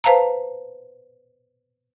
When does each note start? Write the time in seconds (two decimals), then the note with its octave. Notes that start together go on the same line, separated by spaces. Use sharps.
0.04 B4 C5 F5 A5 A#5